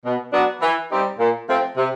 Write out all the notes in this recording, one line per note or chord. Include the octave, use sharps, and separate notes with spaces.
B2
F#3 B3 D4 F#4
E3
G3 C4 D#4 G4
A#2
F3 A3 C4
C3